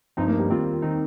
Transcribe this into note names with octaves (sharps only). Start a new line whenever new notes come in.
G2 F3 C4 D#4
A#3
G3
D#3 A#3 C4 F4
D#3 C4 D#4